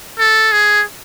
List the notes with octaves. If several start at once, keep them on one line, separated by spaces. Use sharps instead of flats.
A4
G#4